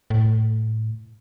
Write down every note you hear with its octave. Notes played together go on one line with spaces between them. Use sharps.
A2